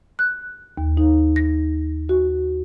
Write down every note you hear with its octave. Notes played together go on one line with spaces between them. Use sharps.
F#6
D#2
D#4
A#6
F#4